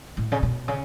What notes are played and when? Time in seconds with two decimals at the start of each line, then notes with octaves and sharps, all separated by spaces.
0.17 A2
0.32 C#3
0.43 B2
0.68 C#3